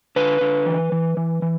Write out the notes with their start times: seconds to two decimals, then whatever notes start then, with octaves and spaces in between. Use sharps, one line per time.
0.16 D3 B4
0.41 D3
0.66 E3
0.92 E3
1.17 E3
1.42 E3